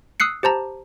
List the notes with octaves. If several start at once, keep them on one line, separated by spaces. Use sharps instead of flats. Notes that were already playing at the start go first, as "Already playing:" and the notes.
D#6 E6 F#6 C7 C#7
G4 C5 A5 A#5